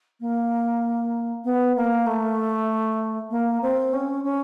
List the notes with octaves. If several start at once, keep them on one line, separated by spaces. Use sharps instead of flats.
A#3
B3
A#3
A3
A#3
C4
C#4
C#4